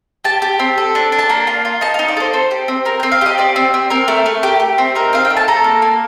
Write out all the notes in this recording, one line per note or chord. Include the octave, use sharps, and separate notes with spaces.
G4 A5
G4
C4
A4
D4
D4
A5
A#3 A#5
F4
F4
D#4 A5
F5
D#4
D5
A4 C5
C4 C5
G4
C4
C4 A#4
C4 G5
F5
G4 D#5
C4 D5
C4
C4
C4 A#4
A3
A3
G4
G4
C4
D#4 A#4
C4 F5
G5
A3
A5
A4 A#5
A#3
A#3